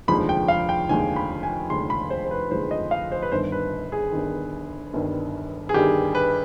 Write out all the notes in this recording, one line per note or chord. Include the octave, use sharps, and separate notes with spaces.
F1 D#2 D3 F3 G#3 B5
G5
F5
G5
F1 D#2 D3 F3 G#3 G#5
B5
G#5
F1 D#2 D3 F3 G#3 C6
B5
C5
C5
B4
F1 D#2 D3 F3 G#3 C5
D#5
F5
C5
B4
G1 G2 D#3 C5
B4
G#4
G1 G2 D#3
G1 G2 D#3
G#4
G1 G2 D#3 G4
B4